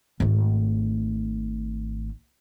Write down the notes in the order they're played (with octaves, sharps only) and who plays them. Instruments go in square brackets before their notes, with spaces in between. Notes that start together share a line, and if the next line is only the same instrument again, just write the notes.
[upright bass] G#1 A3